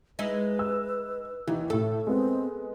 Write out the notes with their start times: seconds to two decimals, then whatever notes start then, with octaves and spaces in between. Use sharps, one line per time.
0.19 G#3 D#4 E4 B4
0.59 E6
1.47 D#2 E3 D#4
1.70 A2 A3 A4
2.07 G#3 B3 C4